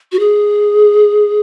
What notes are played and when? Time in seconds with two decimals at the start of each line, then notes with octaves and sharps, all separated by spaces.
0.12 F#4
0.19 G#4